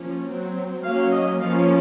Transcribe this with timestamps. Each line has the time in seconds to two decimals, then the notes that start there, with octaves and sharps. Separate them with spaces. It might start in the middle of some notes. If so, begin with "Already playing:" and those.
Already playing: F3 A#3 C#4
0.25 F#3 C4
0.82 F#3 A#3 C#4 F5
1.12 D#5
1.40 F3 A#3 C#4 F5